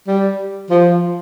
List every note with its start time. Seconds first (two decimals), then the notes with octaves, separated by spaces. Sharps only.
0.07 G3
0.70 F3